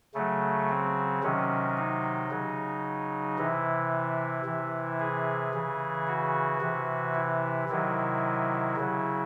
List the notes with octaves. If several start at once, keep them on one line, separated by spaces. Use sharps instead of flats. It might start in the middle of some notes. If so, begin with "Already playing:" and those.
C#3 F#3 A3
C4
C3 D#3 F#3 C#4
D#4
C#3 F#3
C3 E3 E4
C3 E3
G#4
C#3 E3
F#4
C3 E3
E4
C3 D#3 F#3 E4
C#3 F#3